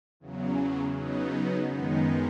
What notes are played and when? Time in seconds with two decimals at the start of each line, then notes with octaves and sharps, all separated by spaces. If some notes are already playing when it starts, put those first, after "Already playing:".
0.20 E2 C#3 F#3
0.93 C#3 F#3 B3 D#4
1.68 F#2 D#3 G#3 B3 D#4